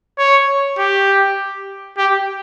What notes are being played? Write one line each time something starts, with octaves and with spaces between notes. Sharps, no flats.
C#5
G4
G4